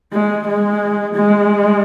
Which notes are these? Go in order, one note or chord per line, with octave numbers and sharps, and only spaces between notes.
G#3
G#3
G#3